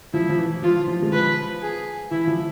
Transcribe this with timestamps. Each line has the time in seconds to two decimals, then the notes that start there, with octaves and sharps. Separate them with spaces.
0.13 F3 E4
0.29 F3
0.38 E3
0.62 F3 F4
0.88 F3
1.02 G#3
1.12 F3 B4
1.62 G#4
2.11 E3 E4
2.27 F3